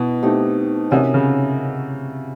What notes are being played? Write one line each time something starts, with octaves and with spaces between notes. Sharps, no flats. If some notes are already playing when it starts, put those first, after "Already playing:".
Already playing: B2 E4 D#5
A3 C4 D#4 G4
C3 C#4 F#4 A#4 D#5
C#3